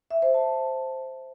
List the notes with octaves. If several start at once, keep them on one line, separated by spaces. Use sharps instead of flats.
E5
C5
A5